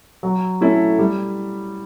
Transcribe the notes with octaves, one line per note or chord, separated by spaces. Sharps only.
F#3
A3 C#4 E4 A4
G3